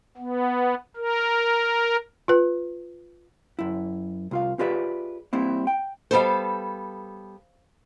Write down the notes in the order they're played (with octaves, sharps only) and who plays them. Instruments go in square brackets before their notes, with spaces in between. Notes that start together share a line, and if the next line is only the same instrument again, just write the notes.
[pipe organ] B3
A#4
[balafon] F4 B4
[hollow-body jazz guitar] F#2 E4
C2 F4 F5
F4 G4 G#4 B4 D5 E5
G3 A#3 C4 E4
G5
[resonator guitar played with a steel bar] G3 B3 A4 [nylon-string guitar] C5 F5